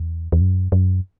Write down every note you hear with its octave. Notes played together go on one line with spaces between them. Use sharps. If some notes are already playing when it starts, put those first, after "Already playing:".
Already playing: E2
E2
F#2
F#2